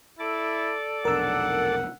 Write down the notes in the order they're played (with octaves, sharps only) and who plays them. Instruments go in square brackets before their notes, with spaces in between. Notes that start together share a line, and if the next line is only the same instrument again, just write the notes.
[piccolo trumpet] E4 [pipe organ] A4 D5 D6
[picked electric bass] F1 B1 D4 [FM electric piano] A#4 E6 [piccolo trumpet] F#5